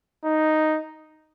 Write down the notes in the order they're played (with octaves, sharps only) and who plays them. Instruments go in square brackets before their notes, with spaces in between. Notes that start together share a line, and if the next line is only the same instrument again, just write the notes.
[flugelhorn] D#4